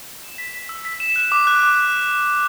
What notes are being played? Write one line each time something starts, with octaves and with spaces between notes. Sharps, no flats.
E7
B6
B6
E6
B6
E7
F#6
D6
F#6
D6